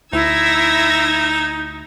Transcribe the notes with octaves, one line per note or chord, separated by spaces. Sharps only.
D2 D#4 E4 E6 G#6 A#6